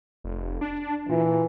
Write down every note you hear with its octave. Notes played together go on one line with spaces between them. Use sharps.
F1
D4
A#2 E3